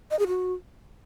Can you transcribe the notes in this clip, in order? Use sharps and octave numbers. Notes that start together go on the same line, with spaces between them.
D#5
G#4
F#4